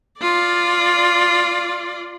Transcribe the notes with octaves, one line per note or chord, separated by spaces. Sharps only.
F4 D5